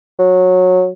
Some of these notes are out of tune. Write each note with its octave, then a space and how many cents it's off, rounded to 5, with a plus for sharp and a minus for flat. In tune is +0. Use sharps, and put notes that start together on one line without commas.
F#3 -15